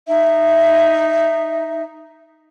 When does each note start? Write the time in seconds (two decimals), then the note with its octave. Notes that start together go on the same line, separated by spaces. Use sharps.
0.06 D#4 E5